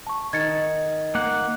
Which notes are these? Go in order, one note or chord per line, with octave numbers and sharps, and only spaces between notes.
A5 C#6
D#3 G#6 A6 C#7
A#3 F#5